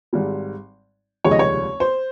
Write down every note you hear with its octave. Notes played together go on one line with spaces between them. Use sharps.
G#1 G#2 G3
F1 D#2 C#3 G#3 C#5
D#5
C#5
C5